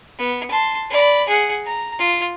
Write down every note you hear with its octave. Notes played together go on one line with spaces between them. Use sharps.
B3
A5 C6
D5 B5
G#4 F#5
A#5
F4